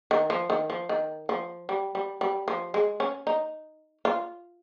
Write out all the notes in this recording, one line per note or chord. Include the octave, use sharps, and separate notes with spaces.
D#3
F3
D#3
F3
D#3
F3
G3
G3
G3
F3
G#3
C#4
D#4
F4